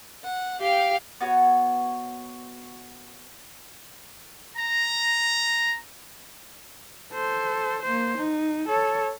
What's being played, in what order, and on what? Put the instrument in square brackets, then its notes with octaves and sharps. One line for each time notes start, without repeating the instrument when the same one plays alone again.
[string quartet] F#5
G4 F5 G5
[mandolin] B3 F#4 C#5
[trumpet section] A#5
[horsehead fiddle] A4 C5
A#3 C5
D#4
A4 C#5